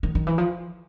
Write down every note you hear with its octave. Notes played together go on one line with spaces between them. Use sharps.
D#3
D#3
E3
F3